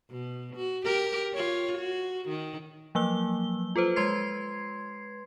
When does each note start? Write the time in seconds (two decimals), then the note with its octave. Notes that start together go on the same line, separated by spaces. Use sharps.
0.10 B2
0.56 F#4
0.85 G4 A#4
1.34 F4 C#5
1.78 F#4
2.29 D#3
2.95 F3 F#3 A#3 E6 G7
3.76 F4 A4 B4 C5
3.96 G#3 B4 C6 G#6 C7